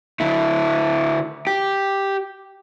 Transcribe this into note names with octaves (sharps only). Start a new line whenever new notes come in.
D3 E4
G4